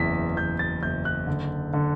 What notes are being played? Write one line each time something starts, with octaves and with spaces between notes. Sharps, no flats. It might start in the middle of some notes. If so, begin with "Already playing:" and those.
Already playing: F#1 E2 B6
E2 G6
A6
F#1 G6
F#6
D3
D3